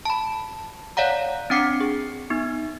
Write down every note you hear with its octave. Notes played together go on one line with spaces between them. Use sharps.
A5 B5
C#5 D5 F5 F#5 A#5
C4 D4 F#5 D6 C7 C#7
G#4
B3 D#4